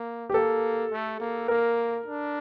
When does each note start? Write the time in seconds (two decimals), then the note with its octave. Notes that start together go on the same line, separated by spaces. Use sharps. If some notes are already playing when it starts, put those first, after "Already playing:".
Already playing: A#3
0.30 G4
0.34 A#3 A4
0.92 A3
1.20 A#3
1.48 A#3 A#4
2.06 D4